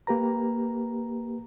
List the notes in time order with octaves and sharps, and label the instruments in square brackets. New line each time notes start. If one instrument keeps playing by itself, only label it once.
[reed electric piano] A#3 G4 B4 A#5